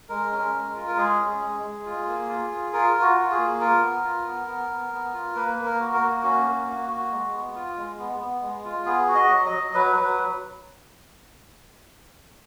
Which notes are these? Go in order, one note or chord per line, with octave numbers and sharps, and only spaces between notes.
G#3 A#4
C#4
G#3
F4
A#4
G#3 G#4
C#4
G#3
G#3
F4
A#3
F4
F4
F4 A#4
F4
F#4
F4
G#4
A#3
F4 A#4
B3
F4
B3
B3
B3
B3
F4
A#3 B4
A#3
A#4
F#4
A#4
A#3
C#4 F#4
A#3
A#3
F#4
G#3
B3
F4
G#3
B3
B3
G#3
F4
B3 G#4
F#4
D#5
F#3
D#5
F#3
F#3 B4
F#3 B4